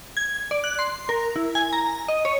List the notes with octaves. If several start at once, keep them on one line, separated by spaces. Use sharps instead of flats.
G#6
D5
F#6
C6
A#4
E4
G#5
A#5
D#5
C#5